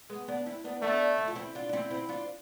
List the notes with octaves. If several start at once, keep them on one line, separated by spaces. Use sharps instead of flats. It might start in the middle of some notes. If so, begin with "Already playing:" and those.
G#3 B3
B3 D4
C4 E4
B3 D4
A3 B3 D4
E4
F4
C4 E4
D4 F4
D4
C4 E4
C4 E4
D4 F4